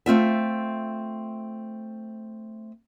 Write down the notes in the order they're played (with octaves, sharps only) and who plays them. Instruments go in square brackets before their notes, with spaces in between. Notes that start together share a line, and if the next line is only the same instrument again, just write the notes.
[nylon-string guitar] A3 C4 F4 E5